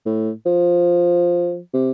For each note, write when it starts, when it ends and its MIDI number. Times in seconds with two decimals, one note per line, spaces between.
0.06 0.30 45
0.46 1.59 53
1.74 1.92 48